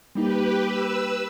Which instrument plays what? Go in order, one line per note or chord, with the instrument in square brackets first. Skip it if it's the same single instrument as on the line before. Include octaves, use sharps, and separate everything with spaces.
[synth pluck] G3 A#3 D#4 [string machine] G4 B4
[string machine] B4 E6